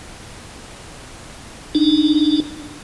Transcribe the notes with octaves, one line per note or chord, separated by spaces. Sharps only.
D4 D#4